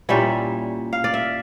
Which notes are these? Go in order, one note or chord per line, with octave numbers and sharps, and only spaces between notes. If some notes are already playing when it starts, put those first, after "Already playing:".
A#2 G3 C#4 E4 E5
F5
D5
E5